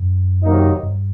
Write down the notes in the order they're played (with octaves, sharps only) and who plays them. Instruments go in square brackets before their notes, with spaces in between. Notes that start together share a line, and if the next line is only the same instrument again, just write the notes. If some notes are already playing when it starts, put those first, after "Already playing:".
Already playing: [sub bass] F#2
[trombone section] C3 D#3 F#3 A#3 D#4
[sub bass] G2